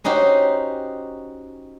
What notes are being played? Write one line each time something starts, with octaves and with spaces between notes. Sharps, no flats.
C#4 D#4 F#4 G4 C5